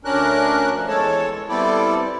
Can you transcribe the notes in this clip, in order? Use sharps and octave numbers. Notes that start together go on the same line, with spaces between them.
D2 C#4 D4 A#4 F#6
A2 F3
E2 G#3 A4 C#5 A5
G3 B3 C4 E4 A4 D5